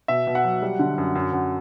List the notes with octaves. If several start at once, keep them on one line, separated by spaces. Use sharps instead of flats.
B2 E5
B2
F#5
F#3
G3
D3
F#2
F#2
F#2